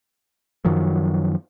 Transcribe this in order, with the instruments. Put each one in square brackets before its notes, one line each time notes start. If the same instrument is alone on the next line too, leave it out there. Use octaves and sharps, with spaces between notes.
[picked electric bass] F#2 D#3 F3 F#3